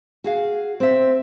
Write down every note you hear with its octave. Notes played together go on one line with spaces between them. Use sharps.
F#4 G#4 F5
C4 E5